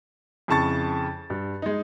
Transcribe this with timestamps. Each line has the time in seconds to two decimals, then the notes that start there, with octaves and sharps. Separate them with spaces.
0.48 F2 C#3 E4 A5 C#6 A6
1.30 G2
1.62 G#3 D#4